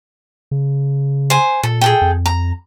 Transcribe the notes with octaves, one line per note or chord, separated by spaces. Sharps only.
C#3
C5 G#5
A#2 A4
G#4 A4 G5
F2
A#5